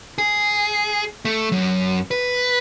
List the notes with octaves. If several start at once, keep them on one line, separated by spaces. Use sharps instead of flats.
G#4
A3
F#2
B4